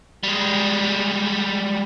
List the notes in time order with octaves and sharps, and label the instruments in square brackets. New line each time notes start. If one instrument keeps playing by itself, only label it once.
[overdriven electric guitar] G3 G#3